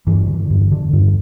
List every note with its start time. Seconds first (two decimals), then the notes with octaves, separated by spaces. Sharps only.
0.07 G2 E3
0.28 D3
0.50 G2
0.72 D3
0.93 G2